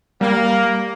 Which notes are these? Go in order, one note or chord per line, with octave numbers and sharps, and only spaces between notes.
G3 A#3